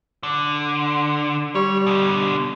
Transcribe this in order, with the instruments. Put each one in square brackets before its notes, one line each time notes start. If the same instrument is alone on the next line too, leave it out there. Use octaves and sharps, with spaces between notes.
[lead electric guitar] D3
[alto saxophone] G3 [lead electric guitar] C#5
[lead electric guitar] B2 D3